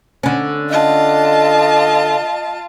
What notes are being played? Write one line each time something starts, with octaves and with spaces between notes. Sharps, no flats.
D3 C#4
F4 D#5 A5